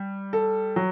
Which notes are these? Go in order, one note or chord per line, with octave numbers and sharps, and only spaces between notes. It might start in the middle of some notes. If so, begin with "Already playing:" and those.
Already playing: G3
A4
F#3